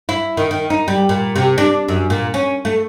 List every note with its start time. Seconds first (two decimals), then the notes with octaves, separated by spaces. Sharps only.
0.09 E4
0.37 D#3
0.51 D#3
0.70 D#4
0.88 G3
1.09 A#2
1.36 C3
1.58 D4
1.88 F#2
2.10 A#2
2.34 C#4
2.65 A3